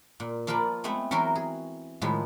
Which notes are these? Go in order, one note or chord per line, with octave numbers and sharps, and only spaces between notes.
A#2
F3 A#3 F4 A#4 B4 D5
G#3 A3 B3 C4 E5
E3 F#3 F#4 A#4 E5 C6
G#4
A2 D#3 F3 G#3 B4